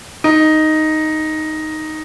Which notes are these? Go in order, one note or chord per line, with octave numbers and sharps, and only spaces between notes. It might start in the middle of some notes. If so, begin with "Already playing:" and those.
D#4